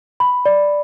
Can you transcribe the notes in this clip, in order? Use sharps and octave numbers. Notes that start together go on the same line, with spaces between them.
B5
D5